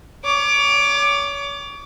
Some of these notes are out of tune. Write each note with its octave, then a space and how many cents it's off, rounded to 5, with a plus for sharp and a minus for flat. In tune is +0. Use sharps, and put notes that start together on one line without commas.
C#5 +35 D6 +15